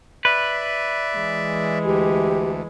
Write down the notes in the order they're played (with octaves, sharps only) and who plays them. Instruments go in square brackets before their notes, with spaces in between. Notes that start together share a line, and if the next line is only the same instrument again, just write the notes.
[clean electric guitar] B4 [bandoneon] D5 E5
[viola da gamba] E3 G#3
[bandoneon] D2 [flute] G4